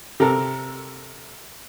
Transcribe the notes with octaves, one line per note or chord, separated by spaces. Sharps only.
C3 A4 A#4